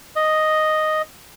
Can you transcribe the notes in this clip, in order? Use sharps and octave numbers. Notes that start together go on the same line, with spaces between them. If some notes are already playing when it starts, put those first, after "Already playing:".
D#5